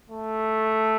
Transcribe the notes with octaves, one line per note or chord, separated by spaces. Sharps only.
A3